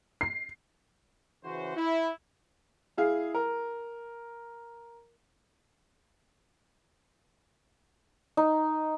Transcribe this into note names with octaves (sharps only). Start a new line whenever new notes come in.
C7
C#3 E3 F#4 C5
E4
E4 G#4 F5
A#4
D#4